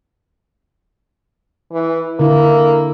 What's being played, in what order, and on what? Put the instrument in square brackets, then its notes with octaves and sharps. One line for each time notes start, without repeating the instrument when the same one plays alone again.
[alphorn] E3
[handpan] D3 E4 [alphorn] A#3